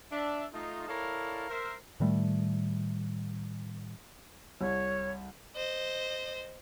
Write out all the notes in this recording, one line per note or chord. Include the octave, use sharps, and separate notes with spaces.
D4 E5
A3 D#4 F4
E4 A4 A#4 C#5 D5 F5
A#4 C5 E5
A2 D#3 G3 A3
C2 C#5
C5 D#5